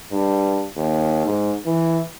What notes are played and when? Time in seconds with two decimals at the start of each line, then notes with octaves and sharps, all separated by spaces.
0.12 G2
0.76 D#2
1.26 G#2
1.66 E3